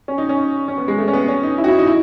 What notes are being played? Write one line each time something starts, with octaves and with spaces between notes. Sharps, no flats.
C#4
D#4
C#4
C#4
B3
G#3
A3
C#4
B3
C#4
D#4
E4
F#4
E4
D#4
E4